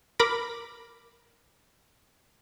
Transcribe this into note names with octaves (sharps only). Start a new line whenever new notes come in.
A#4 B5 D6 A#6